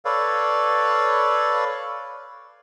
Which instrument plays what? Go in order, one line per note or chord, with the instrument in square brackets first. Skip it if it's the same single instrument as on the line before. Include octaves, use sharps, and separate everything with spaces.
[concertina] A4 B4 C#5 D5 F5